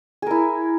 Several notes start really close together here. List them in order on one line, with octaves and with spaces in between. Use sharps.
G#4 A#4 E4